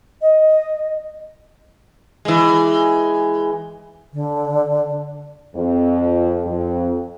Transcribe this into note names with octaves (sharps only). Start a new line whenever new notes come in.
D#5
E3 G#3
D3
F2
F2